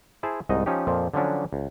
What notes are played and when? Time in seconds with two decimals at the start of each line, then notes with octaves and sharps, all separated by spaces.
0.23 E4 G#4 C5 A5
0.49 C2 G#2 D#4 D#5
0.66 F3 C#4 D#4 G4
0.87 F2 A#2 F3
1.14 D3 F3 F#3 C#4 D4
1.53 C#2